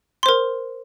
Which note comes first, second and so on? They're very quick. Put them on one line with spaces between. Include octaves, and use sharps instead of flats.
C6 C5 A#4